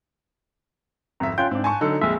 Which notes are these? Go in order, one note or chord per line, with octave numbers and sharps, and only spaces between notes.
G#1 F2 E5 A#5
C#4 F4 G5 F#6 G6
G#2 C4 D4
G#5 A5 C#6
D3 F#3 D#4 A4
A#1 F2 G#3 E5